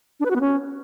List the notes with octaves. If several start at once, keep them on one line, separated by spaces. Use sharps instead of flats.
D4
B4
F#4
B3
C#4